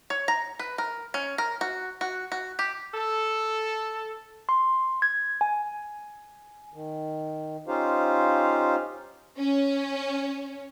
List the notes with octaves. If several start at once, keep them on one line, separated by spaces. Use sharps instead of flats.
C#5
A#5
B4
A#4
C#4
A#4
F#4
F#4
F#4
G4
A4
C6
G#6
G#5
D#3
C#4 D#4 F4 G4 C5 F5
C#4